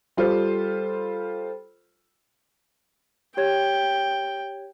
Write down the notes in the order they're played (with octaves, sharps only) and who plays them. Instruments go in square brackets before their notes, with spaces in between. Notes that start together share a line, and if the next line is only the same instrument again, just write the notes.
[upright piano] G3 F4 G4 A4 C5
[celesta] G4 C#5 G#6 [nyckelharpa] G5